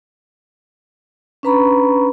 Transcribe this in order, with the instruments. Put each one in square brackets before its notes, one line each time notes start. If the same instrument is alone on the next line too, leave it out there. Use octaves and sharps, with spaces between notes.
[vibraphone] C#4 D4 B4 A#5 B5 C#6